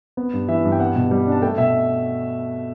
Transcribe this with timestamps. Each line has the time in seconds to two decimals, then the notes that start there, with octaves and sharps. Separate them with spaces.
0.17 B3
0.33 G2
0.48 E3 E5
0.64 G2
0.72 G5
0.80 B3 F#5
0.96 B2
1.11 G3
1.27 D4
1.32 A5
1.42 A3 G5
1.58 B2 E5